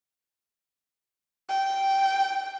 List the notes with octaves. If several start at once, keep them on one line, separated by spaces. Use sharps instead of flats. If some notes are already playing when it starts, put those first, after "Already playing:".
G5